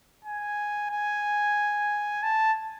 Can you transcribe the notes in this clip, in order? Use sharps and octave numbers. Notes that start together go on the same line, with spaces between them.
G#5
G#5
A5